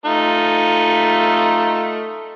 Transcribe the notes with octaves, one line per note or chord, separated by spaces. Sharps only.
A3 D#4 F4